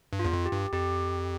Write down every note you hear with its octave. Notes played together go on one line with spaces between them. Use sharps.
G2
F4
E2
F2
G4
G2
F2 G4